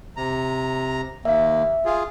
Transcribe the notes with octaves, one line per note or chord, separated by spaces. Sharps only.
C3 A#5
D#2 A#3 E5
F4 G#4